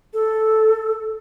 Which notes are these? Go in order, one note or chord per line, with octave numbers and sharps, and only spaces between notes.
A4